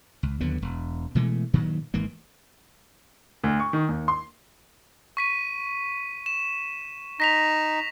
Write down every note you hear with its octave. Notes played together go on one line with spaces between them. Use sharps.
C#2
D#2 D3 F#3 B3
E1
B2 E3 G#3 A3
G2 A#2 D#3 F#3
G#1 G#2 E3 A#3
D2
C#6
D#3
D#2
C6
C#6 B6 D#7
E7
D#4 A#6 B6 F7